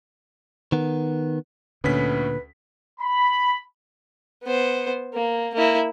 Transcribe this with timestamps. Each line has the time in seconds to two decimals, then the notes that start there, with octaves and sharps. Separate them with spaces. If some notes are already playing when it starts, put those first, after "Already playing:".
0.72 D#3 B3
1.84 D2 A#2 D3 C#4 B4 B6
3.00 B5
4.44 B3 C5
5.14 A#3
5.54 A#3 E4